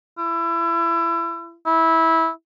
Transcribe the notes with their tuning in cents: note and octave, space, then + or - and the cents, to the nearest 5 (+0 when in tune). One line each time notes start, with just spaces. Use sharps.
E4 +30
E4 -15